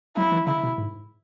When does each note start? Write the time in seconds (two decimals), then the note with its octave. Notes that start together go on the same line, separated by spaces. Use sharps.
0.16 F#3 E4
0.32 E3
0.47 C#3 E4
0.63 B2
0.78 G#2